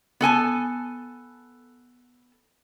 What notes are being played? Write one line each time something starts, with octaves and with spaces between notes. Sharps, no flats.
B3 A4 G#5 A5